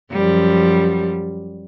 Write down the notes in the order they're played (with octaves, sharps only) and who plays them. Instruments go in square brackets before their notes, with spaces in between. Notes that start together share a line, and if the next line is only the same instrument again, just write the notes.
[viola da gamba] F#2 F3 G3